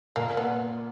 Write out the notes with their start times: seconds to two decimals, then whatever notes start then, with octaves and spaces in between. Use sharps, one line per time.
0.16 A#2 A#3
0.37 B3